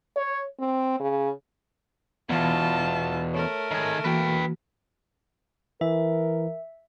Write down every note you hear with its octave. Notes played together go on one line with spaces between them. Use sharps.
C#5
C4
C#3
E2 B2 E3 B3 F4 A5
A3 A#4 C#5
D#3 G#4
E3 A#3 F#4 B4 G5
E3 A#4 E5